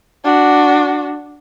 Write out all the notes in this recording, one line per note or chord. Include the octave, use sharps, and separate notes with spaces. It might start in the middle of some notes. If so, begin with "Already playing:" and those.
D4 F#4